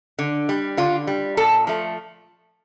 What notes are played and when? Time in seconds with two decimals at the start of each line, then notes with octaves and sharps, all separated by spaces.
0.19 D3
0.49 G3
0.77 D3 F4
1.07 G3
1.37 A#2 A4
1.67 F3 A3